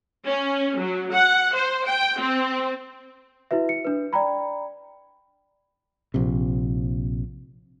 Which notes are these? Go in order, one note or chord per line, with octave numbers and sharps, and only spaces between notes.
C#4
F#3
F#5
C5
G5
C4
E4 F#4 B4 E5
C#7
D4 B4
D5 G5 A#5 B5
A#1 C3